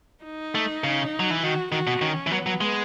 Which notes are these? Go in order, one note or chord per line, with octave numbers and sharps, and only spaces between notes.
D#4
A3
C#3
F#3
E3
D#3 F#4
D#3 F#4
B2
D#3 C#4
E3
F#3 B3
F#3
G#3